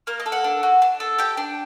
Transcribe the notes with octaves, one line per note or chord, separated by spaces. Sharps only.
A#3 A#4
D#5
A4
F#5
D4
F#4
D4
A4
G4 G5
D4